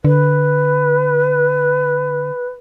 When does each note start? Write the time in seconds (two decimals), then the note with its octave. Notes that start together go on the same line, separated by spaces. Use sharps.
0.05 D3 B4